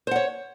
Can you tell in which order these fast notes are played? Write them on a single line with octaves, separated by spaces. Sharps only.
C5 F#5 C#5